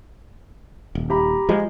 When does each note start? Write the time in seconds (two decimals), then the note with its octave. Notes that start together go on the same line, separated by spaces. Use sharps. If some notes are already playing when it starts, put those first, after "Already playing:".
0.95 D#1
1.10 G4 A#5 B5
1.49 F3 G#3